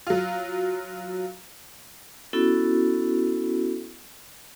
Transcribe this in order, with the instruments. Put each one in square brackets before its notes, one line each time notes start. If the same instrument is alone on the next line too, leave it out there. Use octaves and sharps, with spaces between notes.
[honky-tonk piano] F#3 F4
[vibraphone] B3 C#4 E4 F#4 A4